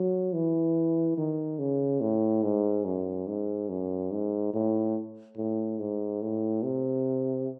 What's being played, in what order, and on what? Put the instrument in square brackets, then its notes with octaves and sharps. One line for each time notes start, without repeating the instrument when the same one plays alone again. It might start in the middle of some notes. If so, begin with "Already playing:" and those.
Already playing: [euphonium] F#3
E3
D#3
C#3
A2
G#2
F#2
G#2
F#2
G#2
A2
A2
G#2
A2
C3